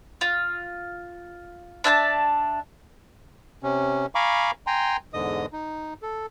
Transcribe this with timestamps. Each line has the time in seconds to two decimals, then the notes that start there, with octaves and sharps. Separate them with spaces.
0.21 F4
1.84 D4 E5 G#5 A5
3.63 C3 C#4
4.15 F5 G#5 A#5 B5 C#6 D6
4.67 G5 G#5 A#5 C6
5.14 E2 G#2 D3 D#5 D#6
5.53 D#4
6.02 A4